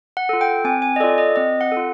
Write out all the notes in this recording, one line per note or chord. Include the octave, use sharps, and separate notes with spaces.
F#5
F4 A4
G5
C4 G#5
G#5
D#5
F4 A4 D5
D#5
C4 D#5
F#5
A4
F4